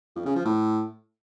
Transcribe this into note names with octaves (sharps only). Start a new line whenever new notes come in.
F2
C#3
F3
A2